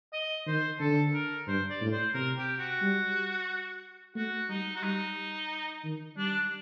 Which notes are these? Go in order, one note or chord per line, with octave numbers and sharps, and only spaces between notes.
D#5
D#3 C5
D3 A4
A#4
G2 C5
D5
A2
C5
C3 A#4
G4
F#4
G3
A3 F#4
G3 D#4
F#4
G3 D#4
D#3
G3 D4